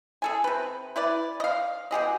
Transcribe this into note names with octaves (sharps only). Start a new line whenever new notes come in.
G#4 A4 G#5
C3 B4
E4 B4 D5
D#5 F5
B2 G4 G#4 D#5